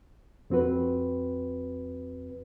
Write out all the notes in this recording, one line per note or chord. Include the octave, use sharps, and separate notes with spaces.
F2 C4 F#4 B4